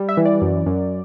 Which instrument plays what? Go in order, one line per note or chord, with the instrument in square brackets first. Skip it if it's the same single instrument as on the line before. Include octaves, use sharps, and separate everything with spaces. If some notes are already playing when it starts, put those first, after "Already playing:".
Already playing: [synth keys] G3
E5
E3
D5
F#2
F#2